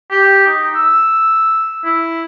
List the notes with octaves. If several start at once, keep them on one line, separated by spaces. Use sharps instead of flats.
G4
D#4
E6
E4